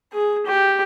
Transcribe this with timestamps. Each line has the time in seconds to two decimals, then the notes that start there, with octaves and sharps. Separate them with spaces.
0.13 G#4
0.46 G4